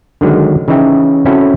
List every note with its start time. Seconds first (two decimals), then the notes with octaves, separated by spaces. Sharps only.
0.21 D3 D#3 F#3 G#3
0.68 C#3 E3 D#4 E5 G5
1.25 C4 C#4 E4 F#4 A4